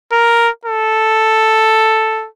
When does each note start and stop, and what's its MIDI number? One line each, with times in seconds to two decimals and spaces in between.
0.12 0.49 70
0.65 2.28 69